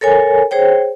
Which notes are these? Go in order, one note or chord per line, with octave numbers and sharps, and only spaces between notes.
A4 A#4 C#5 G#5
G#4 C5 C#5 G5